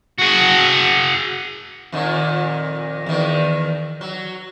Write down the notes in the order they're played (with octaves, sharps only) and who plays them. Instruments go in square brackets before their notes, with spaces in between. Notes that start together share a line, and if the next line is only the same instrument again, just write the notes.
[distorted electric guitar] F#4 G#4
[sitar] F2 A#2 D#3
E2 D#3
F#3